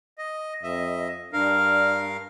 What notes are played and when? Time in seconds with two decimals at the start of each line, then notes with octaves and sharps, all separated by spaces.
0.18 D#5
0.63 F2 D#5 E5
1.33 G2 D4 A#4 F5